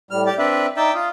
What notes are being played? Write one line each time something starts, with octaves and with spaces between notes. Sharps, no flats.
A2 G3 F6
G4 D5
C4 D4 B4 E5
D#4 D5 E5 G5
F4 D#6